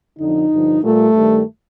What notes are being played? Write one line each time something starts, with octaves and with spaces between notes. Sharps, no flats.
F2 D3 F3 D#4
G2 D3 F3
A#2 G3 A3
G2 D#3 G3